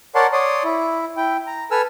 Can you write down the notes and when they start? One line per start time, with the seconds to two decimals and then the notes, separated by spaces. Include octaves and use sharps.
0.15 A#4 C#5 D5 F#5 A5 C6
0.33 C#5 D5 C6 D#6
0.64 E4
1.17 E4 G5
1.47 A#5
1.71 A4 B4 G#5 E6 F6